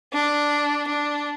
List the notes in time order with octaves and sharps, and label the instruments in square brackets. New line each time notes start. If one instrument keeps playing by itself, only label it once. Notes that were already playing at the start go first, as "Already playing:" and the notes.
[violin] D4
D4